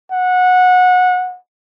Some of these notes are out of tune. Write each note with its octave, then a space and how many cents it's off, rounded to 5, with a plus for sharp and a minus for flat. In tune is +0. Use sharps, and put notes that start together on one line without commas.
F#5 -20